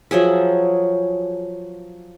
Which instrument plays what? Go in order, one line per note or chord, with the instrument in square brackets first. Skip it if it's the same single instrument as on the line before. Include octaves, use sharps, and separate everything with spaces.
[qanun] F3 F#3 G#4 E5